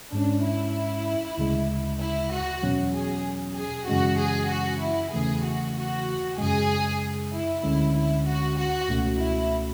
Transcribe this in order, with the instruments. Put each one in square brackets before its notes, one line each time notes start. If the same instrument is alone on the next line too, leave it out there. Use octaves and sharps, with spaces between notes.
[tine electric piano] G#2 G#3 C#4 [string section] D4
[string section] E4
[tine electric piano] D2 C#3 G#3
[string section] E4
F#4
[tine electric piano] E2 B2 F#3 C#4
[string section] G#4
G#4
[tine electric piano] F#2 C#3 E3 G#3 C#4 [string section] F#4
[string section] G#4
F#4
E4
[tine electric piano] E2 C#3 E3 A3 [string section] G#4
[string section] F#4
F#4
[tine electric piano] F#2 C#3 G#3 [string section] G#4
[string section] E4
[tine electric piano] D2 D3 G#3 C#4 [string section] E4
[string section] E4
F#4
F#4
[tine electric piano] C#2 B2 A3 C#4 F#4
[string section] E4